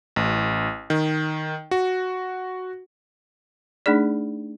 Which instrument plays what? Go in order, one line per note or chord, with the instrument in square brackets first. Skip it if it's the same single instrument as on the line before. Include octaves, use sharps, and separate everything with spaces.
[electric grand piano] A1
D#3
F#4
[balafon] A3 D4 D#4 G#4 D5